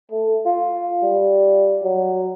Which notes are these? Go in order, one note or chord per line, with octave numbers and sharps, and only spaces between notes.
A3
F4
G3
F#3